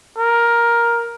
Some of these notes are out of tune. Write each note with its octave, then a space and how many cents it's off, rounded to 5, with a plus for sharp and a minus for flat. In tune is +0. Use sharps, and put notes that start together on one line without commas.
A#4 +10